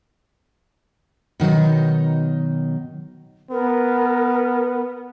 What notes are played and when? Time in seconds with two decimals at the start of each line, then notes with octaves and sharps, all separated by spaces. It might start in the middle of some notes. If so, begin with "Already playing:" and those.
1.40 B2 D#3 F#3 D#4
3.51 B3 A#4